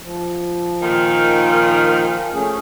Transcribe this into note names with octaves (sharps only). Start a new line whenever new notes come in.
F3
A#2 D#3
A3 C#4 G#4